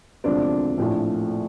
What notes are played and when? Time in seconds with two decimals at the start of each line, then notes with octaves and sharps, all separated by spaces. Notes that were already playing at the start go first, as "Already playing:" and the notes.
0.24 E1 D2 C3 F3 C4 D4
0.78 A#1 A2 F3